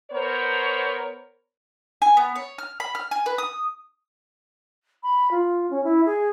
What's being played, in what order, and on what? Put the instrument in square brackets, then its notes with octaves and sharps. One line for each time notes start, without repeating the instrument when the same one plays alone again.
[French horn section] B3 A#4 C5 C#5
[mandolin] G#5
B3
C#5
F6
B5
F6
G#5
B4
D#6
[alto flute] B5
F4
C#4
E4
G#4